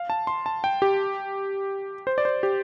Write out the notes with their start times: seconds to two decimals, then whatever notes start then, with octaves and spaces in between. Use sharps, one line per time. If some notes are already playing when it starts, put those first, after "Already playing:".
Already playing: F5
0.10 A5
0.27 C6
0.46 A5
0.64 G5
0.82 G4
2.07 C5
2.18 D5
2.25 C5
2.43 G4